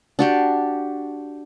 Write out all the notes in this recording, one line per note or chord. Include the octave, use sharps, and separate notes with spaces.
D4 F#4 G4